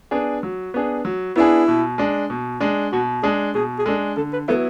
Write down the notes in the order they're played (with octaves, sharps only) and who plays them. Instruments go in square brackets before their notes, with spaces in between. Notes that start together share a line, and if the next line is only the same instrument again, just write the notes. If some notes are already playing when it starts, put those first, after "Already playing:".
[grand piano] B3 D4 G#4
F#3
B3 D4 G#4
F#3
[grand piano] B3 D4 G#4 [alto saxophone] E4
[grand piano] B2
G#3 D4
B2
G#3 D4
[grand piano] B2 [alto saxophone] F#4
[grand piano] G#3 D4 [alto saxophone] G#4
[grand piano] B2 [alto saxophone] G#4
[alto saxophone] G#4
[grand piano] G#3 D4 [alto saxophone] A4
[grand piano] D3 [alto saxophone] A4
[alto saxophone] B4
[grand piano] F#3 B3 E4 [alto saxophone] A4